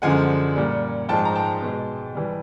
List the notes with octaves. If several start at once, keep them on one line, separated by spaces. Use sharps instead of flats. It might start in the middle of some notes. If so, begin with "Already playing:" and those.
F#2 D3 F3 G#3 F#5 G#5
A#2 G3
G#2 F3 G#3 G5 A5
A#5
G5 A5
B2 G#3
E3 G3